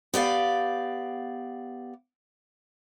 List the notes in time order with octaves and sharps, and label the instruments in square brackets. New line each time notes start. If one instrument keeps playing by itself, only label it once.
[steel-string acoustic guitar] B3 G4 D5 F5